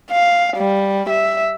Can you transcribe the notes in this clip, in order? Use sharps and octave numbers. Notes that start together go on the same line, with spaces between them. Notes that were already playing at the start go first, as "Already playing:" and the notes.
F5
G3
E5